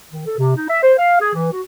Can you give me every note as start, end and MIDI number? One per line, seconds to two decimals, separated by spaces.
0.12 0.26 51
0.26 0.37 69
0.38 0.56 48
0.56 0.69 63
0.69 0.81 76
0.83 0.94 72
0.98 1.16 77
1.20 1.32 68
1.34 1.50 52
1.52 1.61 66